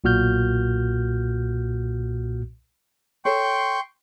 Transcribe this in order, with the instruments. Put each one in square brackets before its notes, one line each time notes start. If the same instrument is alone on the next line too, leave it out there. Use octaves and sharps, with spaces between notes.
[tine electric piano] B1 A#2 F#4 F6 G6
[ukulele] A4 C#5 [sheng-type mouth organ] G5 C6 C#6